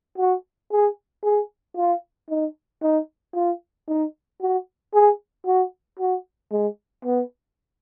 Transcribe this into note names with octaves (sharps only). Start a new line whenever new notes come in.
F#4
G#4
G#4
F4
D#4
D#4
F4
D#4
F#4
G#4
F#4
F#4
G#3
B3